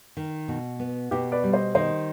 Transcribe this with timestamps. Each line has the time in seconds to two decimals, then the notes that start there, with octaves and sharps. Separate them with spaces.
0.17 D#3
0.48 B2
0.79 B3
1.11 B2 G4 B4
1.32 B4 D5
1.44 G3
1.53 C5 D#5
1.75 D#3 C5 D#5